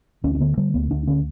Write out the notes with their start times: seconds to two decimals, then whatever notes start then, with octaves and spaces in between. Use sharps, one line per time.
0.24 D2 C#4
0.35 C#4
0.40 D3 B3
0.57 D3 G3
0.74 D2 B3
0.91 D2 D4
1.07 D3 C#4